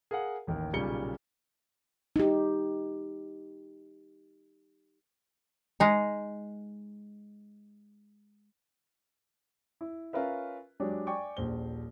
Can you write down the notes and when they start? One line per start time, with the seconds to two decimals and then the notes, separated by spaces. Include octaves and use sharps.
0.11 G#4 A#4 F5 F#5
0.47 A1 D#2 D#3
0.73 B1 A#2 C#3 G3 C#7 G7
2.16 D#4 G4
5.80 G#3 D#4
9.81 E4
10.13 C#4 F4 A#4 B4 E5
10.80 F#3 G#3 D4 G4 C#5 D5
11.07 D5 G5 G#5 C#6 D6
11.37 D#1 A#1 C5 G7